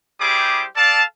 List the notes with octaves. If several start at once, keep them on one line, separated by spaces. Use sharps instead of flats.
G3 E4 G4 G#4 C5 D6
A4 D5 F5 A5